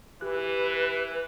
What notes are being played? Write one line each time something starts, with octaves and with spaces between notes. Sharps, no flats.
E3 G4 B4 F#6